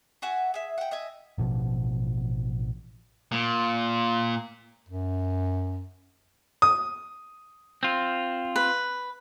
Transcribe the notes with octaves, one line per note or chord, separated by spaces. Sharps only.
F#4 E5 F#5 G#5
G#4 E5
F#5 G5
D#5 E5 G#5
A1 B2 F3
A#2
F#2
D#6
C4 F4
B4